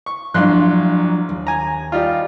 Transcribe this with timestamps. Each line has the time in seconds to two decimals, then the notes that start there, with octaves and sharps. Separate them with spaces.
0.06 C#6
0.34 A1 F3 F#3 D4 C6 F#6
1.29 D#2
1.47 G#5 A#5
1.92 G3 D#4 F4